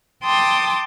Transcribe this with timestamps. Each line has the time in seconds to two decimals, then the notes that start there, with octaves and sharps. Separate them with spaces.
0.23 G5 A5 C6 D6 D#6